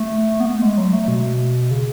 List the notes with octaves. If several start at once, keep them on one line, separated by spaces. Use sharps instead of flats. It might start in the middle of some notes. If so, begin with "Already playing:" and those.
Already playing: A3
B3
A3
G#3
F#3
A3
B2
C#3